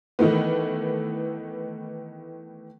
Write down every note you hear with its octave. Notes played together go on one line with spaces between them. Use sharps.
D#3 E3 A3 B3